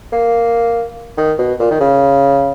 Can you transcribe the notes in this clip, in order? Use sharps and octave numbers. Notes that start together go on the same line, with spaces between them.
A#3
D#3
B2
A#2
D#3
C#3